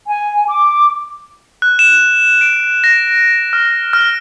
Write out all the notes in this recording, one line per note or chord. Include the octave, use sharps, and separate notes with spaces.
G#5
D6
F#6
E7
D7
A#6
F6
F6